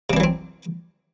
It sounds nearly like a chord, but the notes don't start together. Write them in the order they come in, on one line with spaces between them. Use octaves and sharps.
C3 D4 E3 F#3 C4